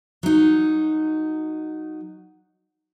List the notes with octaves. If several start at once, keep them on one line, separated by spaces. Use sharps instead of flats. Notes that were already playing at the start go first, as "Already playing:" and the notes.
F#3 D#4